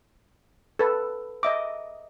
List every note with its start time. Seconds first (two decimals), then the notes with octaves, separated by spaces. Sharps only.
0.79 A4 B4
1.43 D#5 E5 D6